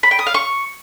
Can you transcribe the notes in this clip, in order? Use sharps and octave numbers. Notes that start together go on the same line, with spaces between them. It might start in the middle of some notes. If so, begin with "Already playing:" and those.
B5
G5
D#6
F5
C#6